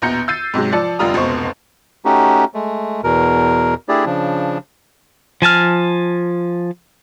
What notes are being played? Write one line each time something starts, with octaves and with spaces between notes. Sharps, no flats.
A#1 E2 B2 A#5 G6 C#7
E6 G6 A6 C7 D#7
G#2 C3 F#3 G#3
F3 D5 A5 C#7
F1 D3 G3 F4 A#5 D#6
F1 C#2 B2 C5 C#6
A3 C#4 D#4 F#4 G4
G#3 A3
E2 B2 A#4
A3 D4 E4 G4 G#4 D5
C#3 F3 D4
F3 G#5 A5 F6